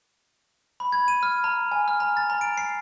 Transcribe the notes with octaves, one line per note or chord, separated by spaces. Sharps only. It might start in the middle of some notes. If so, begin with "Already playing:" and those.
B5
G#6
D#7
F6
A#5
G#5
F6
A#5
A6
A#5
D7
C7